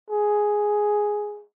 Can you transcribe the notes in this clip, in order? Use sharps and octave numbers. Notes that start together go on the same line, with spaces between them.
G#4